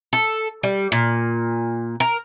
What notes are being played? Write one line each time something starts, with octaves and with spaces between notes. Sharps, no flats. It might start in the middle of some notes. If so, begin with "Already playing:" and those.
A4
G3
A#2
A#4